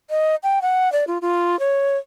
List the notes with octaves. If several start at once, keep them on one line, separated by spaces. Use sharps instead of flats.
D#5
G5
F#5
D5
F4
F4
C#5